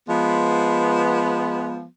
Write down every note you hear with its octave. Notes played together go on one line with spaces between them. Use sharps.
F3 G#3 B3